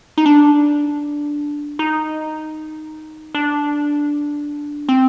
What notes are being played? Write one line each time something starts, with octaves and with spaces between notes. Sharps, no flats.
D#4
D4
D#4
D4
C4